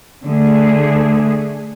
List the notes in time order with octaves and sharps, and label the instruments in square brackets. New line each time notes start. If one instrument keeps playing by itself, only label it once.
[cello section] D3 A3 G#4